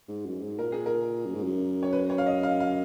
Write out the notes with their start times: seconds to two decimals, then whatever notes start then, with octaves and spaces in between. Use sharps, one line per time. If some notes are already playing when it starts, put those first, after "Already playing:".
0.08 G#2
0.26 F#2
0.42 G#2
0.59 A#2 A#4
0.72 G#4
0.86 A#4
1.26 F#2
1.35 G#2
1.43 F#2
1.83 C#5
1.93 B4
2.10 C#5
2.18 F5
2.26 D#5
2.43 F5
2.60 F5